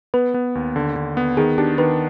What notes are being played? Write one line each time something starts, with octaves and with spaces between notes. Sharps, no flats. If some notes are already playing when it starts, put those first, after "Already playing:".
B3 B4
B3
D#2
D3
D3
B3
D#3 G#4
D4 G4
D#3 B4